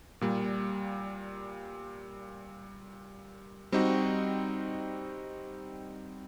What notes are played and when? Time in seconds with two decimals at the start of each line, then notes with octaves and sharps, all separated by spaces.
0.21 A#2 G3 A#3
3.72 G3 C4 D#4 F#4